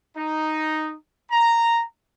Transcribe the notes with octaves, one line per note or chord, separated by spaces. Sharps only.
D#4
A#5